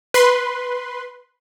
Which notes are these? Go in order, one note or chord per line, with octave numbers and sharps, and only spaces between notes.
B4 C6